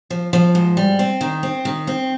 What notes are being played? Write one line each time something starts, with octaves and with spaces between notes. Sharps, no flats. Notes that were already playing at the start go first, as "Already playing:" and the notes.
F3
F3
G#2
G3
C4
D#3
C4
D#3
C4